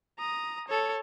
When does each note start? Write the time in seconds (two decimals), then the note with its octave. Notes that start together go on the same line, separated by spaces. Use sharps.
0.19 A#5 D#6
0.68 A4 C#5